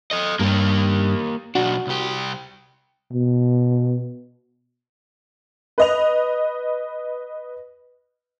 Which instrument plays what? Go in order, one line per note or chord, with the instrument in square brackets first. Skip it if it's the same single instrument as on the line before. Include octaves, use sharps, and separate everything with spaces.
[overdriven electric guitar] A4 D#5
[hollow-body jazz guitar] G2 [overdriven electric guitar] A#3 G4
[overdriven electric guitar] B1 D4 [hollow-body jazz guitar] F#4
[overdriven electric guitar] C2 G4
[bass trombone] B2
[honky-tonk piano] B4 D#5 F7